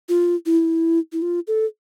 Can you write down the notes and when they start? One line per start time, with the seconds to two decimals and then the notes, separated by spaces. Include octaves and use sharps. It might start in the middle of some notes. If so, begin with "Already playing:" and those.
0.09 F4
0.46 E4
1.13 E4
1.22 F4
1.47 A4